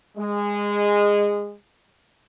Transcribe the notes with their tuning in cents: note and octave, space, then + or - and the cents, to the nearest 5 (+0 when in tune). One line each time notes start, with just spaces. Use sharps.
G#3 -20